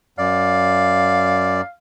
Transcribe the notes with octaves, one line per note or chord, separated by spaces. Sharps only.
F#2 D5 F5